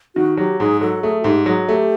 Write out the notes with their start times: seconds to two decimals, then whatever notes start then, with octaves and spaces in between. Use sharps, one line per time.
0.15 D#3 F#4
0.37 F#3 G4
0.60 G#2 G#4
0.81 F#3 A4
1.03 A3 G#4
1.21 F#4
1.24 G#2 G4
1.46 F#3 G#4
1.69 A3 G4